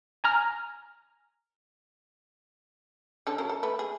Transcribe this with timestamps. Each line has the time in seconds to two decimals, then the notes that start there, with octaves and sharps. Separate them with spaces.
0.24 G#5 A#5 F6
3.27 D3 C#4 A4
3.38 C#3 F#3 A#4
3.49 A4
3.63 A3 B4
3.79 G#4